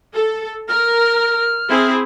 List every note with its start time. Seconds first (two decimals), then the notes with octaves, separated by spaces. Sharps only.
0.14 A4
0.69 A#4 F6
1.69 C4 E4 G#4